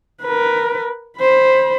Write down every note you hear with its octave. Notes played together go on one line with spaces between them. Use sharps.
A#4 B4
C5 B5